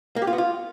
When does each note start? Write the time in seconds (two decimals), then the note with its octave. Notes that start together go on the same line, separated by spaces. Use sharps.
0.16 A#3
0.22 G4
0.27 F4
0.33 B3
0.38 F4